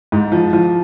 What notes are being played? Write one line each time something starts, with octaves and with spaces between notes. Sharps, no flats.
G#2
F3
F3